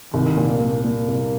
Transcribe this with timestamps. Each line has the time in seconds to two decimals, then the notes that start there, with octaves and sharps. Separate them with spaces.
0.14 C2 D#3
0.37 A#2
0.49 A#3
0.60 A#2
0.84 A#2 A#3
1.08 C2